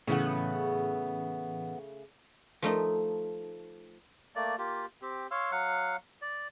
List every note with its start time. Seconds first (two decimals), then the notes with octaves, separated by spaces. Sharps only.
0.07 A2 C#3 E3 A3 B3 C#4 F#5
2.62 F3 A3 D#4
4.36 A3 A#3 D5
4.58 A#3 F4 G4
5.02 C4 G4
5.31 C#5 F5 C6 E6
5.51 F#3 F5 F#5
6.22 D5